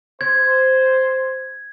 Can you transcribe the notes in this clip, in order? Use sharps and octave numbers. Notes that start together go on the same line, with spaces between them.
C5 G#6